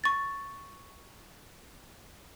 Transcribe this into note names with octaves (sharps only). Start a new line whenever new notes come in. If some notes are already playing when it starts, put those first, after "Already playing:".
C#6 A6